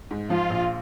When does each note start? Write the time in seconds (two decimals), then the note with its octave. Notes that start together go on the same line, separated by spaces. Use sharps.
0.11 G#2
0.30 F3 F4
0.50 A#1